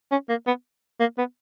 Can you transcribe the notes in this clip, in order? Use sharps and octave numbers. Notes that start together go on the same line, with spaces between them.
C#4
A#3
B3
A#3
B3